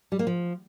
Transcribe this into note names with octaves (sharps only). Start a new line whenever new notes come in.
G3
A#3
F3